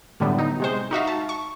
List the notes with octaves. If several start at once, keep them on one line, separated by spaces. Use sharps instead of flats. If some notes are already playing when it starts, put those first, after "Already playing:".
A2 D3 F#3 G3 B3
D#4
C3 G#3 C5
D#4 F#4 E5 F5
A5
C#6